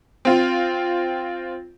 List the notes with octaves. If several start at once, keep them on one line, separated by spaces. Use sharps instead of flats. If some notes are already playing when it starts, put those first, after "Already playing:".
C4 F4